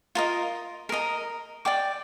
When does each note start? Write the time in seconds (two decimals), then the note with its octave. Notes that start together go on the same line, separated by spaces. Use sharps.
0.15 F4 A#4 D#5
0.89 A#4 D#5 A#5
1.65 D5 G5 D6